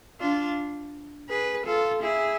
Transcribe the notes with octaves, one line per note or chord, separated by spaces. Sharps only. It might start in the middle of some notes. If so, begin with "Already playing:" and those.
D4 F4
G#4 B4
F4 A4
E4 G#4